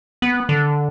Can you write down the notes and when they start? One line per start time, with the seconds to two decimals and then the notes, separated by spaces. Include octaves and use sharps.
0.22 B3
0.49 D3